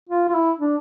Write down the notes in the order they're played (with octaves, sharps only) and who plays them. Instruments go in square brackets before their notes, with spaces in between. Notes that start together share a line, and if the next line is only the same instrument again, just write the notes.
[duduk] F4
F4
E4
D4